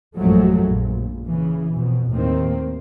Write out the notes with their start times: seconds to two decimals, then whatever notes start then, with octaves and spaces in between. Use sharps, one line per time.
0.17 A1 F#2 F3 F#3 G#3 A3
0.66 A#1
1.27 C#3 E3
1.73 F2 B2
2.11 D#2 A2 D#3 A#3 C4